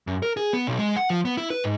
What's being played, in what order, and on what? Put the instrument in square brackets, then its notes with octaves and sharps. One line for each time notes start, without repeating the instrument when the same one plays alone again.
[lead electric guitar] F#2
A#4
G#4
B3
B1
G#3
F#5
F3
B3
E4
B4
G#2